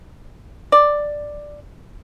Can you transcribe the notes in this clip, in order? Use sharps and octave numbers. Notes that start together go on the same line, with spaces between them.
D5